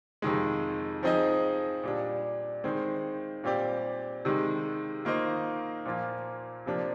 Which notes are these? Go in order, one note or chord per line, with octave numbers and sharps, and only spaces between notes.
F2 C3 D#3 G#3
F3 C4 D#4 G#4 D#5
A#2 G3 D4
D#3 G#3 C4
A#2 G3 C4 G4 D5
C3 D#3 G#3
D#3 A#3 F4 C5 D#5
A#2 F3 A#3 F4
C3 F3 A#3 D4